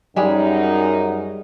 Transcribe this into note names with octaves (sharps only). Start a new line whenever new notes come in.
F#2 G3 G#3 D#4